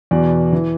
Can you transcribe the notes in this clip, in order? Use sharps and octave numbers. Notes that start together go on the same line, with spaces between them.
E2 B2 D5
E3